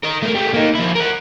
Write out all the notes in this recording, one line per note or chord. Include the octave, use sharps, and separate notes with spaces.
A#4 D#5
A3 A#4
G3 A3
A#3 D#4
F3 E4
A#4 F#5